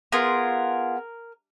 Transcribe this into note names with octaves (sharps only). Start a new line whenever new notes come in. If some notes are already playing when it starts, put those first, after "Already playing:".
B3 F4 G#4 A#4